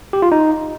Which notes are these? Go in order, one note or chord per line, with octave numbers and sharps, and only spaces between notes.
G4
F4
D#4